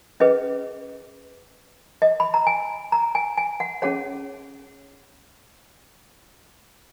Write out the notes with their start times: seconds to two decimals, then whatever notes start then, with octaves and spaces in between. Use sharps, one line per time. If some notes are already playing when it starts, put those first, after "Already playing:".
0.20 C#4 G#4 B4 D#5
2.02 D#5
2.20 B5
2.34 A#5
2.47 G#5
2.92 A#5
3.15 G#5
3.37 G#5
3.60 F#5
3.82 C#4 G#4 C#5 F#5